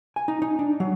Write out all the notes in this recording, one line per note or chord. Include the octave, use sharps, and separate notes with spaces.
G#5
D#4
D#4
D4
F#3